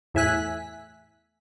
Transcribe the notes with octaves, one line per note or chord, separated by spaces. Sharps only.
E2 A2 E5 G#5 F#6 B6